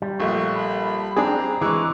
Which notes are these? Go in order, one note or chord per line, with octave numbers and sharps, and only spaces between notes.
G3
A#1 A3 F#4 C#6
A5 B5
C4 D4 G#4 A#5
E3 G#3 C#6 D6